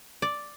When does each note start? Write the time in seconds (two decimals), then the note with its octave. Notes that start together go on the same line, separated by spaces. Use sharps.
0.22 D5